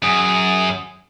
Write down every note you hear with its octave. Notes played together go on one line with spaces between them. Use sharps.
F#2 G#4